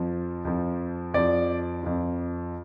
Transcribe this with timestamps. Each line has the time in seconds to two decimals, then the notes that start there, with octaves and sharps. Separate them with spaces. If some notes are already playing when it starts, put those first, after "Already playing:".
Already playing: F2 F3
0.45 F2 F3
1.14 F2 F3 D5
1.83 F2 F3